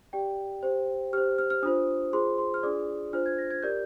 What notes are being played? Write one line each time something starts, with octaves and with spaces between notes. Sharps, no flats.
G4 D5 G5
G4 C5
G4 C5 F6
F6
F6
D4 F4 C5 D#6
F4 G#4 C5 C6
C6
F6
D4 F4 G#4 D5 D#6
D4 F4 C5 F6
G#6
A#6
G#6
G4 A#4 D5 G6